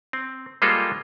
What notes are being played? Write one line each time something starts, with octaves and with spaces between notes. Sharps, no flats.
C4
G3 G#3 A#3 F4 A4 C5